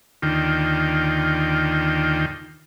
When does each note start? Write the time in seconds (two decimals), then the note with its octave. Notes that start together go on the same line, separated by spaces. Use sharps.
0.22 D#2 D3 D#3 F4 G5